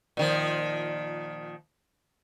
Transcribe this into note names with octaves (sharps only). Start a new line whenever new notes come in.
A#2 D#3 F3